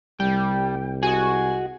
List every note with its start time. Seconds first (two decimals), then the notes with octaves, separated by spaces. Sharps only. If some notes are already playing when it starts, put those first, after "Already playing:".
0.20 C2 G3 G5
1.03 F#4 G#4 D#5 G#5